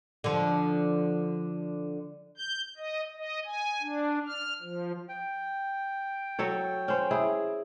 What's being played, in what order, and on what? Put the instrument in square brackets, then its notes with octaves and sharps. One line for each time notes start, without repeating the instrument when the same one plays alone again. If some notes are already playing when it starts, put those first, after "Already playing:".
[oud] D3 F3
[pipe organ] G6
D#5
D#5
G#5
D4
F6
F3
[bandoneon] G5
[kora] F#3 A4 C#5
C#4 C5
E4 G#4